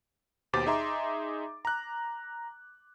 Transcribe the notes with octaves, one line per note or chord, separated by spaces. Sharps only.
D#2 B2 G4 C5 D6 A6
D#4 G#4 E5 A#5 C6
A#5 F#6